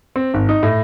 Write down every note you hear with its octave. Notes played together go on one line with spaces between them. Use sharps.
C4
G#1
D#4
A2